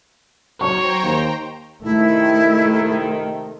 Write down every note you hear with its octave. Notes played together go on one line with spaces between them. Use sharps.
F#3 C5 C#5 G5 A#5 C#6
D#2
F2 C3 D#3 A3 E4